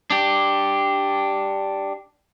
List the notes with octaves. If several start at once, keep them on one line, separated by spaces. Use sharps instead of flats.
D4 G4